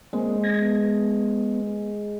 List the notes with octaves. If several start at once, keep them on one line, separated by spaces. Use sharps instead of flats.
G#3 A#3 C4
G#6 A#6
B3